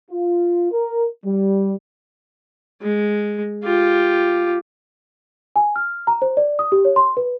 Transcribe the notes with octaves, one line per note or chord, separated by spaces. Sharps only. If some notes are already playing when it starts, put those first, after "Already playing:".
F4
A#4
G3
G#3
F4 G4
G#5
F6
A#5
C5
D5
D#6
G4
C#5
C6
B4